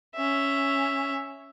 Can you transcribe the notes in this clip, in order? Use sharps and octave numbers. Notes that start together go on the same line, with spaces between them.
C#4 E5